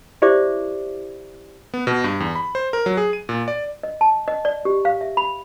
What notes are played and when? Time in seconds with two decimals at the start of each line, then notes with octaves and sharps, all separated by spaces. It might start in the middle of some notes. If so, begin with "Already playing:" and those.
0.22 E4 G4 C5 D5 E5 D6
1.74 B3
1.87 B2
2.04 G2
2.20 E2
2.36 B5
2.55 C5
2.73 A#4
2.86 F#3
2.97 G#4
3.13 D#7
3.29 A#2
3.48 D5
3.83 D#5
4.01 A5
4.28 D#5
4.45 D5
4.65 G4
4.85 F5
5.01 E5
5.17 B5